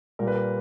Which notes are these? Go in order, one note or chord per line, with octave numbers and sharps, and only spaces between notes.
A#2 G3 A#4
B4
A#4